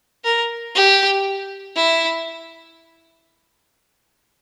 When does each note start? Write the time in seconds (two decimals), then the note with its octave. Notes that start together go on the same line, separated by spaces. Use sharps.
0.24 A#4
0.75 G4
1.76 E4